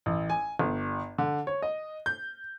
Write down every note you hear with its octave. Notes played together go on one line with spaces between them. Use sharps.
A1
G#5
G1
D3
C#5
D#5
G6